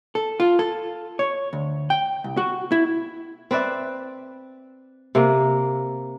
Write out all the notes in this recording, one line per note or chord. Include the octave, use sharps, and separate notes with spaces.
A4
F4
A4
C#5
D2
G5
C2
F#4
E4
C4 B4 D5 E5
C3 A#3